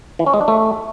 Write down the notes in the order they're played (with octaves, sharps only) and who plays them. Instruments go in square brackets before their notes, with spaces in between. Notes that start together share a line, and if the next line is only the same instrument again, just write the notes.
[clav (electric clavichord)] E3
C#4
G#3
D4
A3